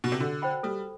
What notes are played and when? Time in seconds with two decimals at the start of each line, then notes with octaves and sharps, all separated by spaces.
0.04 B2
0.12 C3
0.20 D3 F#4
0.42 C5 G5 B5
0.63 G3 A4